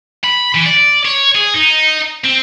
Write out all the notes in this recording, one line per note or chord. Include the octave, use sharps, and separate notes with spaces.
B5
E3
D5
C#5
G#4
D#4
C4